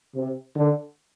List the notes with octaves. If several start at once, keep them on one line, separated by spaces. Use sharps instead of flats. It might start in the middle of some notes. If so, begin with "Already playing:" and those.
C3
D3